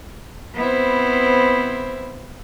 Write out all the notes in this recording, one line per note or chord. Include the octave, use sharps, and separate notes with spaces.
B3 C4 E4 C5